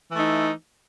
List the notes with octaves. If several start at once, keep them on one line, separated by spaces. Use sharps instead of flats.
E3 A3 D#4